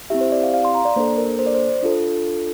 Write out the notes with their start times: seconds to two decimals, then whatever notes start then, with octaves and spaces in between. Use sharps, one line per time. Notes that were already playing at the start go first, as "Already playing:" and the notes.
0.10 C4 E4 G4 E5
0.21 C5
0.32 D5
0.43 F5
0.54 F5
0.65 C6
0.75 A#5
0.85 D5
0.96 A#3 D4 A4 C5
1.17 A#4
1.39 C5
1.46 D5
1.54 C5
1.83 D4 F4 A4